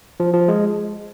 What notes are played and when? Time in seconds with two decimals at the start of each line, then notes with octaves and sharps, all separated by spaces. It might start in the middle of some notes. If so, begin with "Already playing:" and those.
0.20 F3
0.34 F3
0.48 G#3